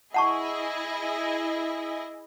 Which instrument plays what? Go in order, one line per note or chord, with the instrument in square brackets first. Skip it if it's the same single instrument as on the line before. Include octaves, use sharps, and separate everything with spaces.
[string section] E4 G#4 D#5 [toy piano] F#5 A5 C#6